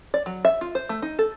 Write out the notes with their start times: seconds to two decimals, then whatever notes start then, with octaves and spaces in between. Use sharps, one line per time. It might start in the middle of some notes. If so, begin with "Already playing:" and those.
0.14 D5
0.26 F#3
0.45 E5
0.61 F4
0.75 C5
0.89 A3
1.02 D#4
1.19 A4